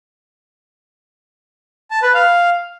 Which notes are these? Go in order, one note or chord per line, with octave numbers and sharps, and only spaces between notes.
A5
B4
F5